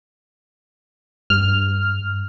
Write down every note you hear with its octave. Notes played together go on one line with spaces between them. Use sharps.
G2 F6